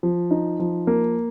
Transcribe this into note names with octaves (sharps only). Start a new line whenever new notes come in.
F3
D#4
F3
A#3